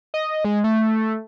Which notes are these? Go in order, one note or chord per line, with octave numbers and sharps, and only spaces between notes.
D#5
G#3
A3